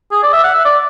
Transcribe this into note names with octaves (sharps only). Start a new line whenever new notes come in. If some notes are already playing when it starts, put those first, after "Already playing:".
G#4
D5
E5
F#5
E5
D5